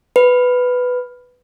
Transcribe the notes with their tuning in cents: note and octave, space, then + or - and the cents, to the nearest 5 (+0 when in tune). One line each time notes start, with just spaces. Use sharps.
B4 +5